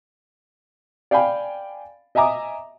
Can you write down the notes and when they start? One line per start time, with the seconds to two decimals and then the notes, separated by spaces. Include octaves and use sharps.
1.11 D5 F5 G5 G#5 B5
2.15 D#5 E5 G#5 A#5 D6 D#6